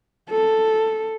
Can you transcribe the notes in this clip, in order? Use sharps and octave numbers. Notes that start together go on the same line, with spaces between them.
A4